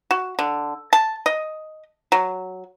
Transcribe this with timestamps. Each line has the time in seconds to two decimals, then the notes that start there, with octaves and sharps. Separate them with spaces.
0.11 F#4
0.39 D3
0.93 A5
1.26 D#5
2.12 F#3